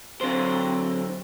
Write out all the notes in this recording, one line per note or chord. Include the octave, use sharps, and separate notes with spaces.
D3 F#3 C4 C5